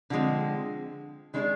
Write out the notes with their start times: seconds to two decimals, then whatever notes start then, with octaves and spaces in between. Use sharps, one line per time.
0.10 D3 F3 G#3 C4
1.34 D#3 G#3 D4 G#4